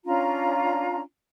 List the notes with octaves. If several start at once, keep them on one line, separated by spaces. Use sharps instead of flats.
C#4 D4 F4 A#5